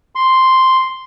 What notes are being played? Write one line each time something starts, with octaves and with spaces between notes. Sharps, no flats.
C6